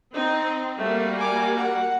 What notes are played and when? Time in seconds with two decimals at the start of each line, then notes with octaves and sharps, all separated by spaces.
0.14 C4 D#4
0.78 G3 A3 A#3 F#4
1.17 G#5 D6
1.57 F#5